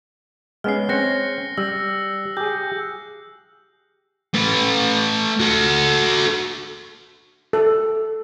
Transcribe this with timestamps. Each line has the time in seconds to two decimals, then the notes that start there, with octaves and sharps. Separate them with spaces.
0.64 G#3 B3 C#4 F6 C7
0.89 C4 C#4 F#6 A#6 C#7
1.58 G3 E6
2.37 G4 G#4 G6
4.34 A3 B4
5.40 F#4 A4
7.53 A4